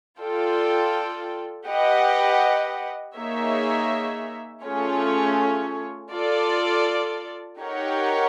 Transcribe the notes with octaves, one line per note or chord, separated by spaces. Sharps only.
F4 A4 D5 G5
G4 B4 D#5 F#5
A#3 D#4 G#4 C#5 E5
A3 C#4 F4 G#4 C#5
F4 A4 D5
D#4 G4 A#4 C#5 F#5